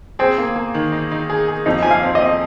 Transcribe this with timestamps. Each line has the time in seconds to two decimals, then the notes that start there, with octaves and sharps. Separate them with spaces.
0.19 C4 G#4
0.38 A#3
0.56 A#3
0.75 D#3
0.92 D#4
1.12 D#4
1.30 G#4
1.48 G#4
1.66 F2 D#4
1.83 F3 G#5
1.91 F5
2.03 C4
2.15 D#5
2.21 C4